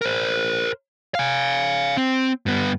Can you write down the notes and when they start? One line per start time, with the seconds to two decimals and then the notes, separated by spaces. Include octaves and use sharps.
0.01 A#4 C5
1.15 F5 G#5
1.97 C4
2.46 G2 B3